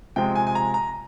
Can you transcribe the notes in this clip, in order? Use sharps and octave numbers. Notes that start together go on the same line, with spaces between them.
C3 F3 G#3 G5
G#5
G#5
A#5
A#5